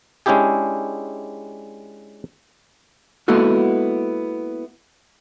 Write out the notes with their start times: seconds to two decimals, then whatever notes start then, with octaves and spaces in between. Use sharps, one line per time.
0.26 G#3 C#4 D4 E4 G4 G#4
3.28 G#3 A#3 B3 E4 F#4 A4